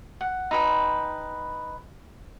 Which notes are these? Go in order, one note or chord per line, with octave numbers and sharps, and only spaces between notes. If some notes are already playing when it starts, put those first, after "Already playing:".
F#5
D#4 B4 G5